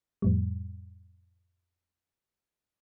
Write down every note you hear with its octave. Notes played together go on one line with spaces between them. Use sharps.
F2 A2 G3